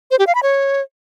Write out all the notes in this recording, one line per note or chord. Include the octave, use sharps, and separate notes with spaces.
C5
G4
F5
B5
C#5